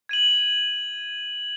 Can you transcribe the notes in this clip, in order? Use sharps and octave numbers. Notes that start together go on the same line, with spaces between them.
G#6 D#7 F#7